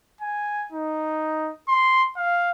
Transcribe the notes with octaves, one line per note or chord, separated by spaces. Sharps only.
G#5
D#4
C6
F5